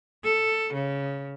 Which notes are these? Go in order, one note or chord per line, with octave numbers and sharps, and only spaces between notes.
A4
C#3